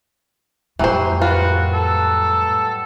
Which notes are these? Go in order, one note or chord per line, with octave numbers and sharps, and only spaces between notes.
F2 A2 E3 F#3 G3 C5
F4 F#4 B4
A4